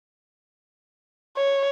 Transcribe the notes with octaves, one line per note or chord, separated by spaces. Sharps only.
C#5